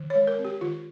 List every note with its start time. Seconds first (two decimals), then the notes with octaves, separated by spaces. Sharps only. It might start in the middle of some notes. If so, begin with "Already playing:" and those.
Already playing: D#3
0.10 G#3 C#5
0.27 A#4
0.38 C4
0.45 G4
0.61 D#3 F4